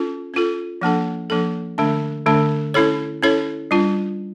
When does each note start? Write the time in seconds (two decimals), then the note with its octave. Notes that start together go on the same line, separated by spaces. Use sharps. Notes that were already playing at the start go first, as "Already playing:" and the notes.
Already playing: C#4 F4 A4
0.34 C#4 F4 A4
0.82 F3 A#3 D4 A4
1.30 F3 A#3 D4 A4
1.78 D3 A3 D4
2.26 D3 A3 D4
2.74 C#4 E4 A4 C#5
3.22 C#4 E4 A4 C#5
3.71 G3 D4 F4